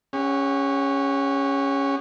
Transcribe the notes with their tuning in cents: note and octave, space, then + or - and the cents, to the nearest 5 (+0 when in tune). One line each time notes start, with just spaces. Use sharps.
C#4 +0 G#4 -45 F#5 +10